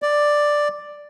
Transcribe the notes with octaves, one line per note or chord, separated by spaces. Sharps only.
D5